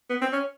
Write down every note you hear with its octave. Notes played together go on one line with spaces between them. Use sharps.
B3
C4
C#4